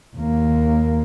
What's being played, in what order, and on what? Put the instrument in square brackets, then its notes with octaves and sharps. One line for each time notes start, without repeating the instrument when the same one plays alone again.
[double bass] D#2 A#3